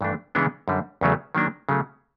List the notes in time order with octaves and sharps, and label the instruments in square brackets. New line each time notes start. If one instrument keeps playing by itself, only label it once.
[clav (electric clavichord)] G2 E3 A3 D4
C#3 E3 G#3 B3 D4
F#2 D3 G3
E2 C#3 F#3 A3
D#3 F#3 A#3 D4
C#3 F#3 A3